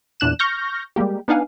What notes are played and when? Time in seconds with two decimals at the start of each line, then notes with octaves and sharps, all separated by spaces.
0.20 E2 A#2 D4 F#6 E7
0.39 C#6 F6 G6 A#6
0.96 G3 G#3 A#3 G4
1.28 B3 D4 D#4 F5 F#5 G#5